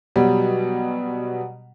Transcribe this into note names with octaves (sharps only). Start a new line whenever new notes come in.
B2 F#3 G3